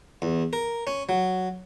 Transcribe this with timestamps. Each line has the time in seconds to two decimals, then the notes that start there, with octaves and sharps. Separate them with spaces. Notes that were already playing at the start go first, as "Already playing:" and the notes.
0.22 E2
0.53 A#4
0.87 C#4
1.09 F#3